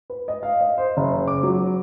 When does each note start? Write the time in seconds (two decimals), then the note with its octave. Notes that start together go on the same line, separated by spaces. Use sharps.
0.10 B4
0.28 D#5
0.43 F5
0.61 D#5
0.78 C5
0.97 F#1
1.28 D6
1.43 F#3